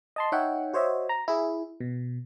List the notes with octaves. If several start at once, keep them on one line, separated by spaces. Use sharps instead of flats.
D#5 A5 C6
D#4 C#5 E5 F#5 G5
F#4 C5 C#5 D#5 E5
A#5
E4 G#4
B2